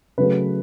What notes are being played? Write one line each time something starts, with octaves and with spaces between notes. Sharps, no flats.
C#3 F#3 A3 B4